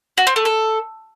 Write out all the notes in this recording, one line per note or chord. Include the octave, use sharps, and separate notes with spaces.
F#4
C4
A3
A4